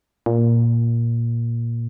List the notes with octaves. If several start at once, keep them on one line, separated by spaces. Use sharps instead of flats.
A#2